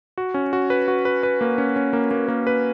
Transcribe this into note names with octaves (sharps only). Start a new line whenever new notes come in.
F#4
C#4
F#4
B4
F#4
B4
B4
A#3
C#4
C#4
A#3
A#3
A#3
B4